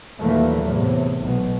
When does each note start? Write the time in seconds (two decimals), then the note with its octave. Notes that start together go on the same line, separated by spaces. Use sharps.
0.20 D#2 A#2 E3 F#3 A3 A#3
0.63 E2 A2 C3
1.22 B1 B2